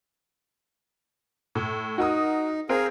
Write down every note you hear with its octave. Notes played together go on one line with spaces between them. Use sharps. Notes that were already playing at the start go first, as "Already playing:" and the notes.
A2
D#4 F#4 A#4 D#6
C4 G#4 A#4 F5